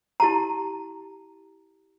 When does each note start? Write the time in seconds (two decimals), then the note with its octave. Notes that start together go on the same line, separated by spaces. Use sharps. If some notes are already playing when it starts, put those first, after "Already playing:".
0.20 E4 G4 A5 A#5